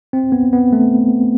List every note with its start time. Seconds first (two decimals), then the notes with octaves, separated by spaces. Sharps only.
0.13 C4
0.32 B3
0.53 B3
0.73 A3